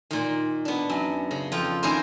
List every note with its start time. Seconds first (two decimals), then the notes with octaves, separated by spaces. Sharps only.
0.11 A#2 D#3
0.65 B3 D4
0.90 F#2
1.31 C#3
1.52 F2 F4 G5
1.83 D#3 C#4 E4 A#4 C5